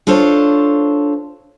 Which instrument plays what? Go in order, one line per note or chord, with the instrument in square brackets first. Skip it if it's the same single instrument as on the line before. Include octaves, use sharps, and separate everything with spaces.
[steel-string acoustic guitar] D4 F4 A4 C5 C#5